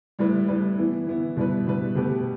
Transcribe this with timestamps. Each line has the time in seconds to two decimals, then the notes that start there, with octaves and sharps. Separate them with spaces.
0.19 A2 G3 E4 B4
0.48 A2 G3 E4 B4
0.78 E3 B3 E4
1.07 E3 B3 E4
1.36 B2 G3 E4 B4
1.67 B2 G3 E4 B4
1.95 B2 A3 G4 B4